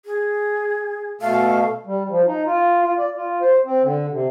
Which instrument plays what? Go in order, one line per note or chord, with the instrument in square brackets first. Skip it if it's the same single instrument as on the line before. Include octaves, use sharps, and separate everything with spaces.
[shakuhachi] G#4
[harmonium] B2 A3 A4 [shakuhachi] F5
[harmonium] G3
F3
D#4
F4
F4
D5
F4
C5
C4
D3
C3